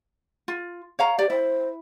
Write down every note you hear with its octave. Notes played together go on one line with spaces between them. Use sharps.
F4
C#5 F5 A#5
G4 D5
E4 C5